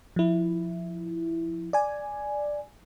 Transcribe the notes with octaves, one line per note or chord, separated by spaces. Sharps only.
F3 E4
D5 G#5